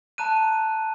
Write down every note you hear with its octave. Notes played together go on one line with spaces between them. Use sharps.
A5 A#5 F#6 D#7